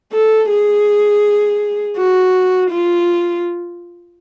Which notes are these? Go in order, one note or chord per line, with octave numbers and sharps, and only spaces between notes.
A4
G#4
F#4
F4